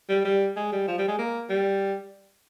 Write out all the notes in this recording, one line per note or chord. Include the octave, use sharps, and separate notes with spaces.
G3
G3
G#3
G3
F3
G3
G#3
A#3
G3